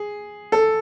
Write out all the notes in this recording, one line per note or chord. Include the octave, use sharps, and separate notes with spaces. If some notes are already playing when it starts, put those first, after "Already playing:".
Already playing: G#4
A4